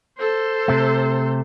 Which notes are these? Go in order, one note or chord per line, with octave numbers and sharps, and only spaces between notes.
A4 C5
C3 A3